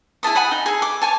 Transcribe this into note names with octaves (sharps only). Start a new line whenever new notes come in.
E4 G#4 A5 D#6
F#5 G#5 B5 D#6
D#4
G#4 A4
D6
C#5 G#5 A5